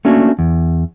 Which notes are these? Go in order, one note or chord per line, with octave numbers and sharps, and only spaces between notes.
A3 A#3 C#4 D4 F#4
E2